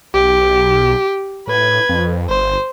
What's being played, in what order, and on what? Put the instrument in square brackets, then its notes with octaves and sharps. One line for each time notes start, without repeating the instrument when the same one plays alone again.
[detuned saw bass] B1 [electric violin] G4
[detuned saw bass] A2 [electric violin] B4 G#6
[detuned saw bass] F2
[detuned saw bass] G1 [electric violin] C5